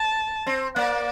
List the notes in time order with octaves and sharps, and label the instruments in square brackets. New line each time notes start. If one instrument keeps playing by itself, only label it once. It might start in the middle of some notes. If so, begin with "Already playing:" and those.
Already playing: [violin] A5
[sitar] C4
[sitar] A#3 [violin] D5